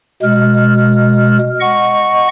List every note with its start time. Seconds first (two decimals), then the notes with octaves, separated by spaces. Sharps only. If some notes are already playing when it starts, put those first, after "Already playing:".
0.22 B2 G#3 F6
1.60 D#5 F#5 C#6